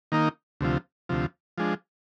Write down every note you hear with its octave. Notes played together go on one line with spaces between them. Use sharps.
D#3 A#3 D#4
D2 C3 F3
D2 C3 F3
F3 G#3 D4